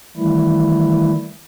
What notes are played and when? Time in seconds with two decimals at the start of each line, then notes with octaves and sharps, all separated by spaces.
0.17 D#3 E3 G3 A3 E4